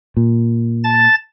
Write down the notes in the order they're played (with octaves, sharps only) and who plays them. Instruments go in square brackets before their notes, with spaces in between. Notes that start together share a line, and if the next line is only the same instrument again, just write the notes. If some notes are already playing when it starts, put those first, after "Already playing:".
[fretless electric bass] A#2
[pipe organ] A5 A6